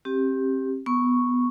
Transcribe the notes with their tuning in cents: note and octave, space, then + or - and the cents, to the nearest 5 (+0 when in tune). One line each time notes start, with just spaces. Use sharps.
C4 +35 G4 +0
B3 +0 C#6 -5